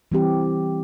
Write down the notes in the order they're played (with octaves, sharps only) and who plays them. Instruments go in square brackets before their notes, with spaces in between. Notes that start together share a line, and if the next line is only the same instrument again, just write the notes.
[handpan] E3 G3 C4 G4